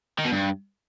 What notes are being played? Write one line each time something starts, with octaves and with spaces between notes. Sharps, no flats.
D#3
B2
G2